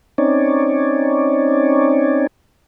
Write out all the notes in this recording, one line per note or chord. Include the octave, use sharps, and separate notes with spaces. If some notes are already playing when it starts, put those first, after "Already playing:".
C4 C#4 D#4 C#5 D5